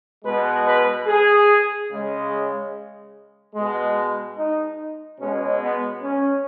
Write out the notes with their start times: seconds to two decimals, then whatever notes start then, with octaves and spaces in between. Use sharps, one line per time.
0.25 B2 G#3 B4
0.67 B4
1.07 G#4
1.90 C#3 G#3
3.55 B2 G#3
4.37 D#4
5.20 B2 G#3 C#4
5.61 B3
6.02 C#4